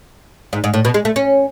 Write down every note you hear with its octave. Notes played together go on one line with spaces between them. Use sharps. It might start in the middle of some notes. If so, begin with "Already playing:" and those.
G#2
G#2
A2
B2
G#3
A3
C#4